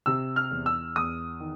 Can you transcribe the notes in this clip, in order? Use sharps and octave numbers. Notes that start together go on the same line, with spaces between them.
C3 E6
F6
E2
E6
E2 D#6
D#3